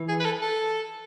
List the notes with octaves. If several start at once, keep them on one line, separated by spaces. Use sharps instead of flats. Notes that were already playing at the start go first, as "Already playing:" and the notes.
Already playing: E3
G#4
B4
A4
A4